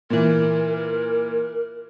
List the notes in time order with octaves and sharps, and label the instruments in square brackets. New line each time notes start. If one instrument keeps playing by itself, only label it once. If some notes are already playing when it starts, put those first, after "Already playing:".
[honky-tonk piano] A#2 E3 [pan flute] A#4